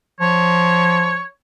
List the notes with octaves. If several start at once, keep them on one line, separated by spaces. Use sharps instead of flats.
F3 C#5